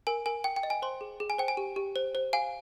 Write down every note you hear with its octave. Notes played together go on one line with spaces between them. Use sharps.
A#4 G#5
A#4 G#5
G5
G5
D#5
G#5
C5 C6
G#4
G#4
G#5
C5 G5
G#5
G4
G4
C5
C5
F5 G#5